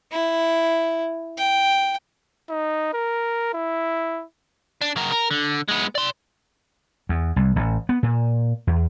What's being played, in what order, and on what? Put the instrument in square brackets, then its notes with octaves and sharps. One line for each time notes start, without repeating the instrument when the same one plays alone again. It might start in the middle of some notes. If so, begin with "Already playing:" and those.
[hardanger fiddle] E4
G5
[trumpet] D#4
A#4
E4
[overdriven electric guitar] D4
C#3 A#4
A#4
D3
G#3 B3
D5 C6
[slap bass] E2
C2
A1
B3
A#2
E2